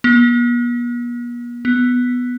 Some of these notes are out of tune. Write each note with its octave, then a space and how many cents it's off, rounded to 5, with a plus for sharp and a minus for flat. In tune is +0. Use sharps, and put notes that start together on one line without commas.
B3 -45
B3 +0